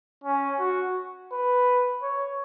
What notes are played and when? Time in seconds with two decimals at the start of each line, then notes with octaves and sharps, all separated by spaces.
0.24 C#4
0.59 F#4
1.32 B4
2.02 C#5